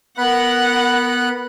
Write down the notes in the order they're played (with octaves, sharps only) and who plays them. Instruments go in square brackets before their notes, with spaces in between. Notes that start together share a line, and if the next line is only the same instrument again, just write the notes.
[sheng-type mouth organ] B3 B5 F#6 [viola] A#4 F#5